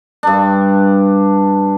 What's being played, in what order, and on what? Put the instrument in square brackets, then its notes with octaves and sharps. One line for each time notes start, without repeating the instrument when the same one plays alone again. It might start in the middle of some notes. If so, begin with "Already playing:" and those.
[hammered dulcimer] G2 D4